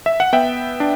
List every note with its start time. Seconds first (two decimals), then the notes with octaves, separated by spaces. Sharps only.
0.06 E5
0.20 F#5
0.33 B3 E5 G5
0.80 D4